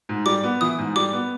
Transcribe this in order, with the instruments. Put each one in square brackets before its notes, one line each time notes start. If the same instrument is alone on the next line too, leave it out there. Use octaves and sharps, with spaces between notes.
[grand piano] G#2
[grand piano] G3 [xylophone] D6
[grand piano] B3
[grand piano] E3 [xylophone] D#6
[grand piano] G#2
[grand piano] G3 [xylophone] D6
[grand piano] B3